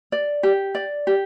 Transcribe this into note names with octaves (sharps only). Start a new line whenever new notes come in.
D5
G4
D5
G4